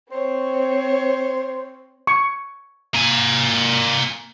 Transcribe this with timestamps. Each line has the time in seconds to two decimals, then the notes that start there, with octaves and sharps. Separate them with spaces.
0.11 C4 C5 C#5
2.07 C#6
2.95 A#3 G#5